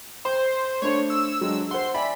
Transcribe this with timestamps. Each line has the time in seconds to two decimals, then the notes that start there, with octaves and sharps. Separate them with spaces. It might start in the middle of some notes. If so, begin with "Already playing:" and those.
0.25 C5 C6
0.82 A3 D4 C5 C#5
1.10 E6
1.41 F#3 G#3 D4
1.71 C5 F#5 C6
1.94 D5 E5 G#5 B5